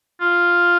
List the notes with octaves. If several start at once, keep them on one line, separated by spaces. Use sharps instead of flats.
F4